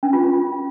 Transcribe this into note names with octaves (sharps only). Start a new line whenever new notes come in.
C#4
F4
F4